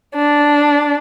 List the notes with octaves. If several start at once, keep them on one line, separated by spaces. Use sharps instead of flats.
D4